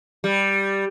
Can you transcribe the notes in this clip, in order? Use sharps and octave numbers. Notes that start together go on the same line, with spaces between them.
G3